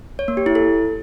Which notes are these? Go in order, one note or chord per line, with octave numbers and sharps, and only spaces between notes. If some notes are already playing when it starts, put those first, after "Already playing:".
C#5
A#3
G4
E4
A4